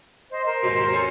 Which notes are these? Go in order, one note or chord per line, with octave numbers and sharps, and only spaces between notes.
C5 D#5
A#4 C5
D#2 G#2 B2
C#4 A4